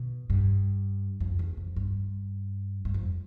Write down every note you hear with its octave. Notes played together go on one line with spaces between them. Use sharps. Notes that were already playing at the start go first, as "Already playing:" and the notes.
Already playing: B2
G2
F2
E2
F2
G2
G2
F2